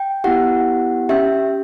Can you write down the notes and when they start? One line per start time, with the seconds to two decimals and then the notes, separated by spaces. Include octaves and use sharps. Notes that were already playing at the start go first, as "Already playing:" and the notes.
Already playing: G5
0.24 B3 E4 G4 F#5
1.09 C#4 G4 E5